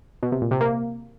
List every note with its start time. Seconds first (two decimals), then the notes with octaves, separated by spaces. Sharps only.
0.23 B2
0.32 C3
0.42 A#2
0.51 C3
0.61 A#3